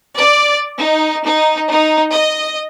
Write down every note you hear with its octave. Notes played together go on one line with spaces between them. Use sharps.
D5
D#4
D#4
D#4
D#5